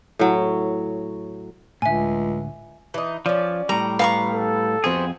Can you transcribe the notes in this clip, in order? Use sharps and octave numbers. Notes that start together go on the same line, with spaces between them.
A2 F#3
C#2 A2 D3 E5 G#5
E3 D#4
F3 C#4 D5
A2 G3 A#5
B3 F5 A#5 C#6
A4
F2 B3 C4 F#4 G#4